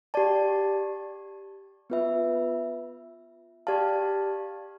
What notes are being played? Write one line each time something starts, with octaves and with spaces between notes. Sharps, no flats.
G4 D5 A5
B3 F4 B4 E5
G4 D5 F5 A5